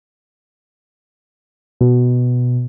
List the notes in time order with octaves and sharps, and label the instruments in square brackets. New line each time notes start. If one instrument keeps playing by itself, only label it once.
[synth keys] B2